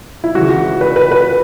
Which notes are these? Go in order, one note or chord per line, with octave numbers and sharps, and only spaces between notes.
E4
C#3 E3 G#3 F#4
F#4
B4
B4
B4